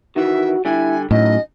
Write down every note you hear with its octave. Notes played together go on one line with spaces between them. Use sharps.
D#3 E3 F#4 E5
D3 G3 E4 G#5
F#2 A2 D#4 D#5